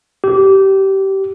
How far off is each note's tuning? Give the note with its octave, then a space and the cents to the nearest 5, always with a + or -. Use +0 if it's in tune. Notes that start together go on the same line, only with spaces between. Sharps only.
G4 -20